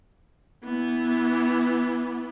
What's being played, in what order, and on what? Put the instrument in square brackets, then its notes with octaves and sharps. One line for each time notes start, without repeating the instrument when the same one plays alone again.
[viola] E3 B3